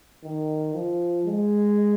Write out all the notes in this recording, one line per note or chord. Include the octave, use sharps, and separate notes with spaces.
D#3
F3
G#3